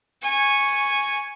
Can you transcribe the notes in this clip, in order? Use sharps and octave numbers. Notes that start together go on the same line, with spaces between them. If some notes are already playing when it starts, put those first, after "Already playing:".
G#5 C#6